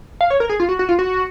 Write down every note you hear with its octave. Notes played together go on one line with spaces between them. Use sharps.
F5
C#5
A#4
G#4
F4
F#4
F#4
F4
F#4